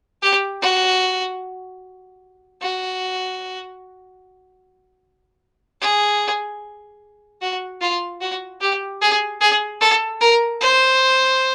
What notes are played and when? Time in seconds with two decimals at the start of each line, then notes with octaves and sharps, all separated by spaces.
0.22 G4
0.62 F#4
2.62 F#4
5.81 G#4
7.41 F#4
7.81 F4
8.21 F#4
8.61 G4
9.01 G#4
9.41 G#4
9.81 A4
10.21 A#4
10.61 C5